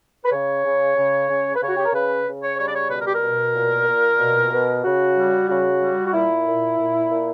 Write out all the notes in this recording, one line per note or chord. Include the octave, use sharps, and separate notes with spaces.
B4
C#3 C#5
C#3
C#3
C#3
B4
C#3 C#5
F#4
G4
A#4
C#3 B4
C#3
C#5
G3 C#5
D5
C#5
B2 B4
A#4
G4
A#4
B2
A#2
A#2
B2
B2
C#3 F#4
G3
C#3 F#4
G3
F#4
A#2 E4
A#2
A#2
A#2